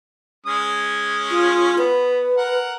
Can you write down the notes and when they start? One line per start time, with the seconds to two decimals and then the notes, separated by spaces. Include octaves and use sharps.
0.46 G#3 C#4 D#6
1.31 F4
1.78 B3 B4
2.38 A#4 F#5